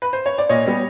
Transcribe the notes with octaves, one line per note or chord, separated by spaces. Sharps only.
B4
C5
C#5
D5
A#2 C#5 D#5
G3 B3